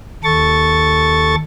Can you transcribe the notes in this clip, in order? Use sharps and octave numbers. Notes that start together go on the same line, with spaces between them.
D#2 A4 C#6 A6